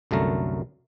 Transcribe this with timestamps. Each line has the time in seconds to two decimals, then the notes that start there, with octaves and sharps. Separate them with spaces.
0.11 C2 F#2 D3 A3 A#4